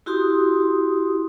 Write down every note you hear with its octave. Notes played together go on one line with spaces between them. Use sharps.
E4 F#4 G4 C6 D#6